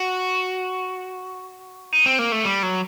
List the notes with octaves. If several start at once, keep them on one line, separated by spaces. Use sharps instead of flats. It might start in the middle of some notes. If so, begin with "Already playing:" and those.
Already playing: F#4
D#4
C4
A#3
A3
G3
F#3